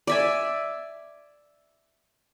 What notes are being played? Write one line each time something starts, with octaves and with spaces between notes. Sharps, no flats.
D5 E5 G#5